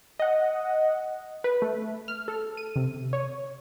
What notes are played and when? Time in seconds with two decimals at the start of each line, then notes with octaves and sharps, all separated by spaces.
0.20 D#5 F#5
1.44 B4
1.62 A3
2.08 F6
2.28 A4
2.57 D#7
2.76 C3
3.13 C#5